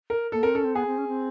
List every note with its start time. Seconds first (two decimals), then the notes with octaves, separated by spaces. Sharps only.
0.10 A#4
0.32 A#3 A4
0.43 C4 A#4
0.54 C#4 A4
0.64 C4
0.75 B3 G#4
0.86 C4
0.97 C#4
1.07 C4